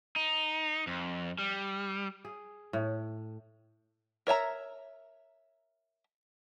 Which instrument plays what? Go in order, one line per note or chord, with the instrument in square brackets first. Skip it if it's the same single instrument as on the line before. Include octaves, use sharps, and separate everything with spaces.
[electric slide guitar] D#4
F2
G3
[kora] G#4
A2
[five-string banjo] A#4 C#5 E5 A#5